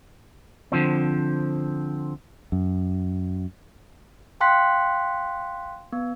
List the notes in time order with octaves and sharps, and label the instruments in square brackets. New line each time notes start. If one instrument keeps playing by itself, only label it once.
[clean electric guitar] D3 F3 C4
[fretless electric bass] F#2
[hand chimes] F5 G5 C6 F#6 B6
B3